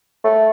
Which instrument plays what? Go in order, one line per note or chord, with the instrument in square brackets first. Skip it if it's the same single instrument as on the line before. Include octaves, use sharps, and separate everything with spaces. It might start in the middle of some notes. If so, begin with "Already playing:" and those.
[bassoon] A3